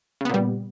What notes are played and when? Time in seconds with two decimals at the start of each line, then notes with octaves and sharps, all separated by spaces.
0.21 C#3
0.25 B3
0.30 A#2
0.34 G3